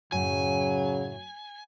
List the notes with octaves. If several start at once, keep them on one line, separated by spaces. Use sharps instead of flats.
F#2 A2 C#3 F#3 G#5